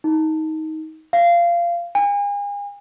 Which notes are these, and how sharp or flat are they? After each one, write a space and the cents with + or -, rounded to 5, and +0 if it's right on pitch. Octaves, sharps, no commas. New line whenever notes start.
D#4 +20
F5 -20
G#5 -40